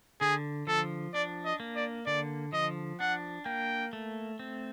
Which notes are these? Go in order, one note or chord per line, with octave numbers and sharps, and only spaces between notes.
D3 G#4
F3 A4
D4 D5
D#5
A#3
D5
D3 D5
F3 D#5
D4 F#5
A#3 G5
A3
C4